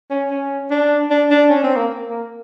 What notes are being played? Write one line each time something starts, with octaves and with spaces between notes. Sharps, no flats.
C#4
C#4
D4
D4
D4
C#4
C4
A#3
A#3